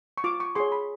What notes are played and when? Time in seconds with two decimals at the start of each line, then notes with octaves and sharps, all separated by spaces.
0.18 C#6
0.24 F4 D6
0.40 C#6
0.55 G#4 C#5 C6
0.72 B5